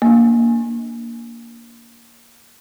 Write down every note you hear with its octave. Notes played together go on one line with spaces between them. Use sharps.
A#3 D4